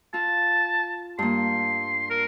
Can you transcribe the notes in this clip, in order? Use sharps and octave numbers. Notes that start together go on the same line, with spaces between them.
F4 A5
G2 A#3 C6
A#4